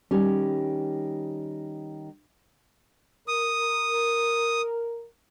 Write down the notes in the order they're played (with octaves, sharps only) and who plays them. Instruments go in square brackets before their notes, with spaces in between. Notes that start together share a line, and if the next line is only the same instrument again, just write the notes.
[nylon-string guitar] D#3 G3 C#4
[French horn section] A#4 [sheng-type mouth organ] D#6